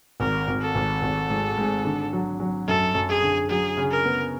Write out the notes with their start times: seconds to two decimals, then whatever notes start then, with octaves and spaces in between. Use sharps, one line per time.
0.20 G#1 A#4
0.48 G#1
0.62 A4
0.75 G#1
1.02 G#1
1.30 G#2
1.57 G#2
1.85 D3
2.13 F#3
2.40 F#3
2.68 F#2 A4
2.95 F#2
3.09 G#4
3.22 D3
3.50 F#3 G#4
3.77 C#3
3.91 A#4
4.05 B3